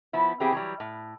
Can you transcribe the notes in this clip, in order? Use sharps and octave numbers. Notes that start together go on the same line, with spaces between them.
F3 B3 E4
E3 B3 C4 E4 G4 G#4
E3 F#3 G3
A2